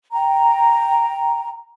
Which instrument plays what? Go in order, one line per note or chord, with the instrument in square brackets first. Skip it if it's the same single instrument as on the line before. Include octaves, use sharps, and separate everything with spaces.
[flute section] G5 A#5